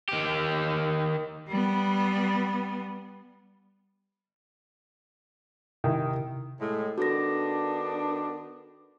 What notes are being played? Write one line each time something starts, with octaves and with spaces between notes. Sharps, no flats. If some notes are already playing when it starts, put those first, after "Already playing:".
D#3 G4
G3 B3
C3 D#3 E4
A2 G#3
D#3 B3 D4 F#4 A4 A#6